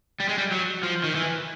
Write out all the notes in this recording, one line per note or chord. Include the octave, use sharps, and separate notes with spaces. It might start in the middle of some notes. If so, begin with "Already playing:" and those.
G3
G#3
G3
F#3
F3
D#3
E3